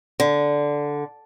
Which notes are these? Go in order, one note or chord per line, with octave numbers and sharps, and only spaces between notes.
D3